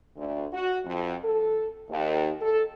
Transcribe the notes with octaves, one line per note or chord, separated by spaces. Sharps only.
D2
F#4
F2
A4
D#2
A4